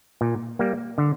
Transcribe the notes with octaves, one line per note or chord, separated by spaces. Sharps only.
A#2
G3 A#3
D3